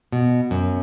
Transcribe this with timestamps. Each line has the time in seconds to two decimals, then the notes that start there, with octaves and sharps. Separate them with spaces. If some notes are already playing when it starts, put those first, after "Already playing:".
0.12 B2
0.51 F#2